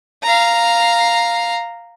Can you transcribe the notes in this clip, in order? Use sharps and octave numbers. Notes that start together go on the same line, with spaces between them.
F5 A#5